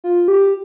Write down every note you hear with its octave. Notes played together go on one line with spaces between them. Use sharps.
F4
G4